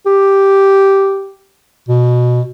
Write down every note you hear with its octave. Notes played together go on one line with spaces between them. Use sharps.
G4
B2